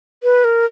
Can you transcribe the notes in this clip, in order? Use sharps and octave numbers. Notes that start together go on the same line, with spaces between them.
B4
A#4